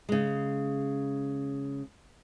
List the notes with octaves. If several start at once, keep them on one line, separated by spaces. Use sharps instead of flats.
C#3 G#3